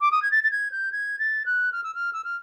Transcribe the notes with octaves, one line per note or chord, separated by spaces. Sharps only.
D6
D#6
G#6
A6
A6
G#6
G6
G#6
A6
F#6
F6
E6
F6
E6
F6